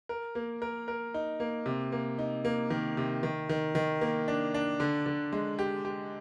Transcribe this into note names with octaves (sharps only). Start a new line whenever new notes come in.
A#4
A#3
A#4
A#4
D#4
A#3
C3
A#3
D#4
A#3
D#3
C3
D#3
D#3
D#3
A#3
D4
D4
D3
D3
G#3
G4
G4